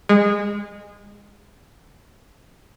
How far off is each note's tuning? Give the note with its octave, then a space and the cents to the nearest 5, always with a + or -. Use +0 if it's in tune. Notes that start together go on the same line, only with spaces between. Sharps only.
G#3 -20